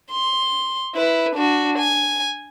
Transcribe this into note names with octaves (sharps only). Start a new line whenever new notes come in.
C6
E4 B4
D4 F#4
G#5